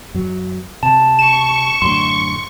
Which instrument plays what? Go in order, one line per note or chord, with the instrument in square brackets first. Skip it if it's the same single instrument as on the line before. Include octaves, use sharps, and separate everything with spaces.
[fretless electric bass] F#2 F#3
[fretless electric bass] C3 [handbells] A5
[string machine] C#6 [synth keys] E7
[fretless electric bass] F#2 A2 D3 [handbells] C6